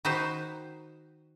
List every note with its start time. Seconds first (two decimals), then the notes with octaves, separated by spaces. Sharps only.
0.05 D#3 D#4 F#4 B4 C5